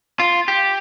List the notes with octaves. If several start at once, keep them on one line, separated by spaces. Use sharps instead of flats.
F4
G4